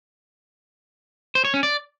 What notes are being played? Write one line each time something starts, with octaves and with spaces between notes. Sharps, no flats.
C5
C#5
C#4
D5